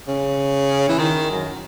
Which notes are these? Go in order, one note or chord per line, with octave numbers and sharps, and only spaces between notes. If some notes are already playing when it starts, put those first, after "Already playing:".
C#3
E3
D#3
F#2